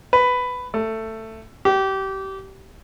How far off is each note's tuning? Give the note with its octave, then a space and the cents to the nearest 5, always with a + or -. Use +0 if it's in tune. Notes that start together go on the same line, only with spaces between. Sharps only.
B4 +10
A3 +15
G4 -25